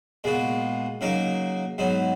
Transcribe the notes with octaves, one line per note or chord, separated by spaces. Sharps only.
A#2 G#3 B3 F#4
C#3 F#3 A#3 D#4 A#4
G#2 F#3 B3 D#4